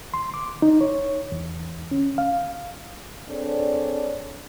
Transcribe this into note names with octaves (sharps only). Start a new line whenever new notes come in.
C6
D6
D#4
C#5
E2
C#4
F5
C4 D4 G#4 A4 C#5 D5